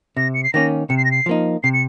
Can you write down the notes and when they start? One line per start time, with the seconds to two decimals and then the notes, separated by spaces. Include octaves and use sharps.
0.17 C3 A#6
0.34 C#7
0.44 C7
0.53 D#3 A#3 C#4 A#6
0.90 C3 C#7
0.97 C7
1.05 A#6
1.11 C7
1.26 F3 A#3 D#4
1.63 C3 C7
1.73 C#7